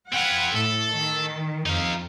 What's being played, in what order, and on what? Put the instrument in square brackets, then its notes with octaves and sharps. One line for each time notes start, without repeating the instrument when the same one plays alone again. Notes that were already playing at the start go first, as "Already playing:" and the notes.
[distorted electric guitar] C4 F4 [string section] F#5 B5 G#6
[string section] A2 [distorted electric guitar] A4
[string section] D#3
[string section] F2 [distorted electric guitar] D#4 F5